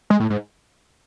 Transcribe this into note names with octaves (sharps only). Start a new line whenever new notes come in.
G#3
A2
G#2